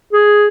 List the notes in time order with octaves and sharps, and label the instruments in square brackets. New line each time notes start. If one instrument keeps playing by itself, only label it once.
[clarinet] G#4